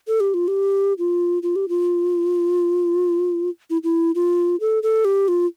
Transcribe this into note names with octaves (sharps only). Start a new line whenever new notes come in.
A4
G4
F4
G4
F4
F4
G4
F4
E4
E4
F4
A4
A4
G4
F4